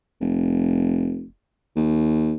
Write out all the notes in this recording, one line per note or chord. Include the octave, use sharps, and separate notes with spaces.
F1
D#2